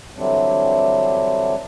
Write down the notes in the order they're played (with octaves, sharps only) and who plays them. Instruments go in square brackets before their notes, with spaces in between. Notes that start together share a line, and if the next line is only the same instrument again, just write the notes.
[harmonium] D3 E3 F#3 G3 C4 D4